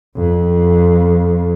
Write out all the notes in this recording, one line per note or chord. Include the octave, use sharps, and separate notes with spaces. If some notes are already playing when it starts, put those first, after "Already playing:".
F2